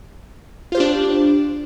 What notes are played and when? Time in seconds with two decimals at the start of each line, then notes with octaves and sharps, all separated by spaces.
0.72 F4
0.75 C5
0.77 G4
0.80 D4